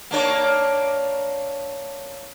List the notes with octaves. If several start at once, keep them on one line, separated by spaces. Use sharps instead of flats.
A#3 D4 C#5